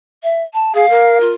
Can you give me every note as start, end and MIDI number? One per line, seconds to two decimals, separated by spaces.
0.23 0.43 76
0.53 0.74 81
0.74 0.89 68
0.74 1.18 77
0.90 1.28 70
1.20 1.34 65